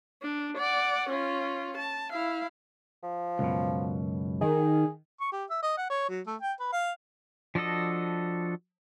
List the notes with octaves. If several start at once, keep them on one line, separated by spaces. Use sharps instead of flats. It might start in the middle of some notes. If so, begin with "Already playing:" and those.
D4
D5 F#5
C#4 F4
A5
E4 F5
F3
C#2 F#2 B2
D#3 G#4
C#6
G4
E5
D#5
F#5
C#5
F#3
A3
G5
B4
F5
F3 D4 F#4 A4 D#5